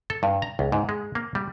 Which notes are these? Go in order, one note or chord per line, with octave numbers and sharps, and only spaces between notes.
A4
G2
A#5
C#2
G#2
G#3
A#3
G3